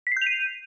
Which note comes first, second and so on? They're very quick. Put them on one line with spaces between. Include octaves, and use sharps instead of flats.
B6 C7 G6 F7 D#7